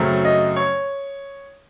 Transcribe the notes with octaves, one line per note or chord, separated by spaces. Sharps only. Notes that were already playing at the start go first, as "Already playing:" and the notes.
Already playing: F#2 C#3 F#3 A3 C4
D#5
C#5